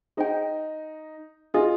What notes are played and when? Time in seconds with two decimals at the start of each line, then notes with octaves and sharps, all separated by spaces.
0.17 D#4 G#4 C5 G5
1.54 F4 G#4 D#5 G#5